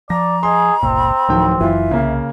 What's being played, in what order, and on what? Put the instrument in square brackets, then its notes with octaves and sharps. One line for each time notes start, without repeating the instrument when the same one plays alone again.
[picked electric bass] F3 [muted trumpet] D5 [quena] A#5 [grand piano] A#6
[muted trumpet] G#4 [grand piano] D#5 C6
[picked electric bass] G1 C#2 A#2 [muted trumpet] C4
[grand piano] D1 D#3 G5 [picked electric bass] F3 G3
[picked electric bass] F#1 F#2 F#3 [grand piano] E3 F4 [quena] E5
[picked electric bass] C2 [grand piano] C#3 A#3